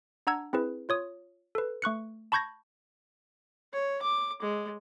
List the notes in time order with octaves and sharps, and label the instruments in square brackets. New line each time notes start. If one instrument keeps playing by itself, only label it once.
[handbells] D4 F#5 A#5 E6 G#6
C4 E4 G#4 B4
F4 C#5 D#6
A4 B4
A3 C#6 F#6 C#7
A5 B5 C#6 G6 G#6 A#6
[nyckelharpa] C#5
D6
G#3